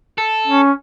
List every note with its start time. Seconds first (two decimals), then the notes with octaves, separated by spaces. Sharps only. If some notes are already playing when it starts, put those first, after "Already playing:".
0.18 A4
0.47 C#4